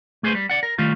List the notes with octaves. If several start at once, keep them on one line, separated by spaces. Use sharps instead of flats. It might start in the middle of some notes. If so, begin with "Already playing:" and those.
A3 G#4 B4 C5
G3
D5 F#5
A#4
D#3 G3 A3 F4